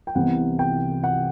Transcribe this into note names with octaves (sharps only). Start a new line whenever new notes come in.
G5
C2 C3 E3 B3 F#5
G5
F#5